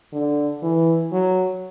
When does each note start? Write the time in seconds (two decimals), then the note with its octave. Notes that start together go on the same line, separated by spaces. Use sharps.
0.13 D3
0.62 E3
1.12 F#3